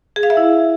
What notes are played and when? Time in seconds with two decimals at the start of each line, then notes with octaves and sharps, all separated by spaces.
0.16 G#4
0.23 F5
0.30 E5
0.37 E4